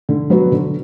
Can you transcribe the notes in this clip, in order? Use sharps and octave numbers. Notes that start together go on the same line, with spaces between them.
D3
F#3 B3 F#4
D3